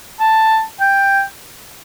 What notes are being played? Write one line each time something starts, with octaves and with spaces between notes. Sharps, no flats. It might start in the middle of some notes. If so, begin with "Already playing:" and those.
A5
G5